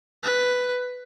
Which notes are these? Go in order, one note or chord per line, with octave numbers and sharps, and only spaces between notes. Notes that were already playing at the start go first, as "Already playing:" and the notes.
B4